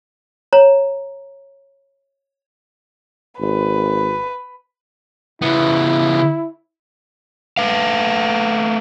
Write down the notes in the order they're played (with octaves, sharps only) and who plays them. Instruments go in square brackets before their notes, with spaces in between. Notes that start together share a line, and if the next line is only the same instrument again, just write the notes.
[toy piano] C#5 A#5
[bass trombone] G#1 [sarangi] B4
[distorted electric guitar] C#3 B3 [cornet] E4
[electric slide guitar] A3 B4 F5